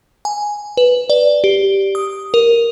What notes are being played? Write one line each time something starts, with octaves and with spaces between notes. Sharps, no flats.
G#5
B4
D5
G4
D#6
A#4